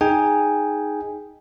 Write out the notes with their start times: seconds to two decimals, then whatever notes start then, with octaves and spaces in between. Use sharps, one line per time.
0.01 D#4 G#4 G5 G#5